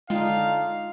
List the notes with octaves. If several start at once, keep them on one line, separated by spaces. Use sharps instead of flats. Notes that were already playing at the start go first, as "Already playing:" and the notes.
D3 G#3 D4 D#4 F4 F5 G5